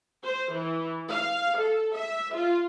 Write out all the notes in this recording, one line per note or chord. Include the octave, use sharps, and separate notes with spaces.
C5
E3
F5
A4
E5
F4